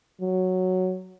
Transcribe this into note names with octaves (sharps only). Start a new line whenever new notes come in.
F#3